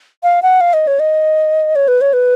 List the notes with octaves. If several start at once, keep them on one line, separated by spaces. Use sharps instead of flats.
F5
F#5
F5
D#5
C#5
D#5
C#5
B4
C#5
B4